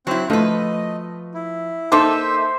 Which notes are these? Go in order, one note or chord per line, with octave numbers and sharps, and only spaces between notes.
F#3 C4 E4 F#6
F3 A3 B4 D#5
E4
A#3 D#4 A4 C5 E5 D6